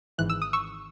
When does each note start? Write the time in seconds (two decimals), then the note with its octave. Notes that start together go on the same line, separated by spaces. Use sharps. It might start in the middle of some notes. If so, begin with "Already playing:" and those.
0.18 G#1 G#2 E3 F#6
0.30 E6
0.42 D#6
0.53 C#6 E6